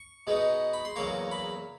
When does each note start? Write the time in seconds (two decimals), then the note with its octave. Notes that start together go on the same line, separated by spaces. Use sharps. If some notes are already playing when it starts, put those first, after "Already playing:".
Already playing: C#6
0.27 B2 G#3 B3 D#4
0.73 B5
0.85 C6
0.96 E2 C#3 F#3 A#3 C#6
1.31 B5